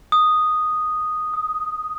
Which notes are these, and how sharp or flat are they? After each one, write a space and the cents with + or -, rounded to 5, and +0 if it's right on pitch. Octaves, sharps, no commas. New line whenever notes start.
D#6 -5
D#6 +20